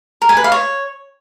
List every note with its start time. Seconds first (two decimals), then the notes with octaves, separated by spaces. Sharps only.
0.22 A#4
0.29 G#5
0.37 B4
0.44 F5
0.52 C#5